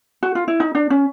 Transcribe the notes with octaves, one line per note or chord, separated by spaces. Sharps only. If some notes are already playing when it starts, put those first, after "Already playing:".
F#4
F4
E4
D#4
D4
C#4